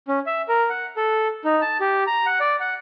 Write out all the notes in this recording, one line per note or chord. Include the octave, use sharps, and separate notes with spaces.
C#4
E5
A#4
F#5
A4
D#4
A5
G4
A#5
F#5
D5
F#5